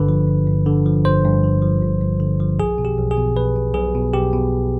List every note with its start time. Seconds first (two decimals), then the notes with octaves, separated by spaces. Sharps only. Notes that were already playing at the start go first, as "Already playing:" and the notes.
Already playing: G1 G2 D3 B4
0.09 F3
0.27 G1
0.47 G2
0.66 D3
0.86 F3
1.04 G1 C5
1.24 G2
1.44 D3
1.62 F3
1.82 G1
2.02 G2
2.20 D3
2.40 F3
2.59 B1 G#4
2.78 B2
2.85 G4
2.97 B1
3.11 G#4
3.17 B2
3.36 B1 B4
3.56 B2
3.74 B1 G#4
3.95 B2
4.14 B1 G4
4.33 B2